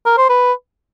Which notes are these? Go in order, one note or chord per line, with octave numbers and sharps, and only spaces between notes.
A#4
C5
B4